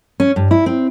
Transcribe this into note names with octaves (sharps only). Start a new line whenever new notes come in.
C#4
G2
E4
C4